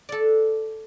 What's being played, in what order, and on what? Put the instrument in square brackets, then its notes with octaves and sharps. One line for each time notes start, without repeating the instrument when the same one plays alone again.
[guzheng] A4 D5